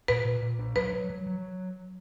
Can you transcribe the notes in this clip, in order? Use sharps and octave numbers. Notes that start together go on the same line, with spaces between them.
A#2 B4
A#2
A#2
D4
F#3 B4
F#3
F#3
F#3